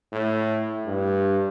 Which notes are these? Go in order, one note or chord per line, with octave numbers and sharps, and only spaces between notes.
A2
G2